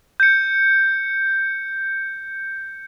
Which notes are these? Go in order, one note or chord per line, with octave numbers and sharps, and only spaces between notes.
G6 C#7